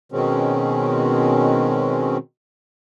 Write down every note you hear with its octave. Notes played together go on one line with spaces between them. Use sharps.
B2 D#3 G#3 C4 C#4